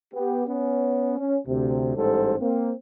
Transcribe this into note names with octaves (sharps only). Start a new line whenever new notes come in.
B3 G4
B3 C#4
C#4
D2 C3
A1 G#2 G3 A4 C5
A#3 C4